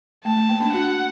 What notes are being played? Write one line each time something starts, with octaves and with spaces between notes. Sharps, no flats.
A3 A5
A3
A#3
A#3 D4
D4 F#4 F#5